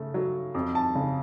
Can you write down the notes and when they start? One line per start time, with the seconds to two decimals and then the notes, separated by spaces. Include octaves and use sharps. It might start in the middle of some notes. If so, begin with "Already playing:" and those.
Already playing: C#3 A3
0.14 F#3
0.55 F2
0.75 A5
0.95 C#3